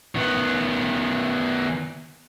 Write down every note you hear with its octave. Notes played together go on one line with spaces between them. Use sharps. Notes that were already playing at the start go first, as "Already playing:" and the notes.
D#3 B3